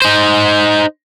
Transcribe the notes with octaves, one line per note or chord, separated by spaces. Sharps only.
D#4 C5